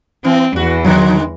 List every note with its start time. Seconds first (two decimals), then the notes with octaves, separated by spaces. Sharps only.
0.24 E3 C4
0.56 E2 E3 F#4
0.85 D3 D#3 F#3 G#3